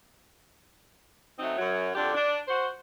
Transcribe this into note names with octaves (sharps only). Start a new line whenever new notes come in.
F#3 A3 C4 D#4
F#2 F#3
F2 D3 D4 G4
D4
F#4 C5